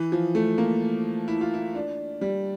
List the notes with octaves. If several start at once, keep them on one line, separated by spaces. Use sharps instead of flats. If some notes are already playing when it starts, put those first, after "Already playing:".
Already playing: E3
F3
A3
A#3
E4
F4
E4
D4
G3